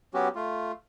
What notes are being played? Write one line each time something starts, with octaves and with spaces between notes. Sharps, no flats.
F#3 B3 C#4 F#4 G4
A3 F4